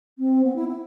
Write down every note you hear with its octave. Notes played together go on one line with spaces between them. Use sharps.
C4
B3
E4
E4